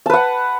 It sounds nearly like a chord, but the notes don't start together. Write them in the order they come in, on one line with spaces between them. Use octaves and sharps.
A5 B4 F#5